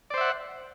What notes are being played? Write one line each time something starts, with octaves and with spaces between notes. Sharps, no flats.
C5 D5 E5 F#5